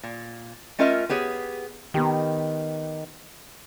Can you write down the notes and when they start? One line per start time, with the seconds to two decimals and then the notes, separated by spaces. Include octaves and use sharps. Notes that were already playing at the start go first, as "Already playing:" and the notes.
0.03 A#2
0.79 A3 C#4 F4 A#4 D#5 E5
1.09 B3 G4 G#4 C#5
1.94 D#3 B3 G4